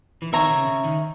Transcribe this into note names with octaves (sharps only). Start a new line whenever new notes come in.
E3
D#3 C#5 E5 A#5
C#3
C#3
D#3